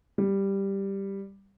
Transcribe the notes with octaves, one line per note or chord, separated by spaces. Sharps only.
G3